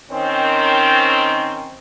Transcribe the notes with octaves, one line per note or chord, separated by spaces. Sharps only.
D#3 C4 C#4